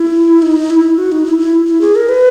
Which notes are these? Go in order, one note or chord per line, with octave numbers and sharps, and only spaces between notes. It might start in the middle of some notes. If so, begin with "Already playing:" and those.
Already playing: E4
D#4
E4
F#4
D#4
E4
E4
E4
G#4
A#4
B4